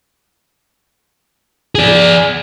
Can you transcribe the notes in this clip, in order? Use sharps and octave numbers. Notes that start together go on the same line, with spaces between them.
G#4 D5